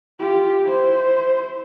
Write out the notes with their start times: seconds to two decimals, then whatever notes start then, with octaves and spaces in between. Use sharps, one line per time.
0.19 F4 G4
0.66 E4 C5